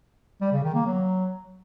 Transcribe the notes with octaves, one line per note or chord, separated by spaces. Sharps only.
G3
C#3
D#3
A#3
F#3